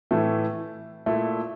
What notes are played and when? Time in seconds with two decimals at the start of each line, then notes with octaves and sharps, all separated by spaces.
0.11 A2 E3 A3
1.06 A#2 A3 E4